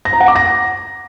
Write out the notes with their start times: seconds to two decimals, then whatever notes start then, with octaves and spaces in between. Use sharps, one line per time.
0.05 A#6
0.13 A#5
0.20 F#5
0.28 D6
0.36 A#6